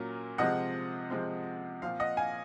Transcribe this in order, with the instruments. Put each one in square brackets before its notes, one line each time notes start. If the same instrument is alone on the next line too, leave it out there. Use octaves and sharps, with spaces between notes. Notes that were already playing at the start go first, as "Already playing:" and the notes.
Already playing: [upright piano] A#2 F#3 A#3 C#4
C3 F3 G#3 C4 D#5 F#5
C3 F3 G#3 C4
A#2 F3 C4 F5
D#5 F#5
F5 G#5